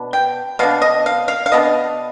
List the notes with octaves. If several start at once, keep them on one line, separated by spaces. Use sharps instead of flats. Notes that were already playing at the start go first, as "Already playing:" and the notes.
Already playing: B2 B3 D4
G5
B2 B3 D4 F5
D#5
F5
F5
F5
B2 B3 D4 D#5